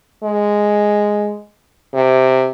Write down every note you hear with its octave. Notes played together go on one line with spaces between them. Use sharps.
G#3
C3